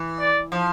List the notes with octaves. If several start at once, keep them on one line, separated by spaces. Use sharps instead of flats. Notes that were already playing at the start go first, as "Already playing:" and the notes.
Already playing: E3
D5
F3